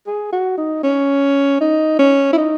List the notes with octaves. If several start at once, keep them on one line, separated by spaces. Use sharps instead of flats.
G#4
F#4
D#4
C#4
D#4
C#4
E4
D#4